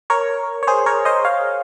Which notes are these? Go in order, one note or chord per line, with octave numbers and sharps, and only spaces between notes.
A#4 C#5
C#5
G#4 C5
A#4 C#5
C5 D#5
C#5 F5